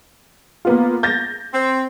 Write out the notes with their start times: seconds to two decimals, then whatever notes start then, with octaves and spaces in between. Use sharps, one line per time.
0.65 A#3 B3 F4
1.03 G6 A6 A#6
1.53 C4